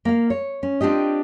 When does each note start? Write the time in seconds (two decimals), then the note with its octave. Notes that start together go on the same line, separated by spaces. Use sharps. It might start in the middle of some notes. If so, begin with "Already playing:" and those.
0.05 A#3 F5
0.30 C#5
0.63 C#4
0.81 C4 D4 F4 G4 D#5